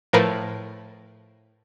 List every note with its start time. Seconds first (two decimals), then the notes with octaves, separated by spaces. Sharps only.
0.13 A2 F3 A#4 B4 D7